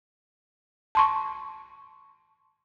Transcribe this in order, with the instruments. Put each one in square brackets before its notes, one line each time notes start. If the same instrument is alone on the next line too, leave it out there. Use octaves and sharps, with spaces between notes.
[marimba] A5 C6 C#6